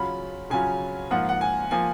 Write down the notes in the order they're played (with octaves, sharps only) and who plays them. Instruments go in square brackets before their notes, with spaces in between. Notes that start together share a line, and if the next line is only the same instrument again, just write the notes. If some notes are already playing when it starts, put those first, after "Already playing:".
Already playing: [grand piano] C#3 F#3 C#4 F4 [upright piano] B5
[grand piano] C#3 F#3 C#4 F4 [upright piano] G#5
[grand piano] G#2 F3 A#3 F4 [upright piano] F#5
[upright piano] F#5
G#5
[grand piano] F3 A#3 F4 [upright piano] G#5